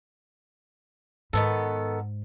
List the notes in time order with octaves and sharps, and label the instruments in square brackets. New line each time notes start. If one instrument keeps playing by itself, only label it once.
[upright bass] G#2 [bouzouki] D#3 B3 A4